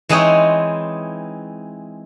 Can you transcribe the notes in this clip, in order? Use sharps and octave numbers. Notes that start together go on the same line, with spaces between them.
E3 G#3 C4 D#4 G#4 C#5